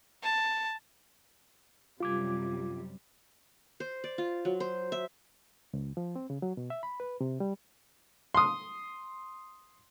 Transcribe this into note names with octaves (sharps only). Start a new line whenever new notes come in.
A5
F#2 C3 G3 F4 D6 G#6
C5
D5
F4
F#3
C5
E5
C#2
F3
C4
C#3
F#3
B2
E5
B5
B4
C3
G3
C6 D#6